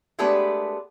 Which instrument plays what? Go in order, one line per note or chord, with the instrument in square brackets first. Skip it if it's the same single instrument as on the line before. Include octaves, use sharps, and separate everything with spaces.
[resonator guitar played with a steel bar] G#3 A3 B3 D4 G4 B4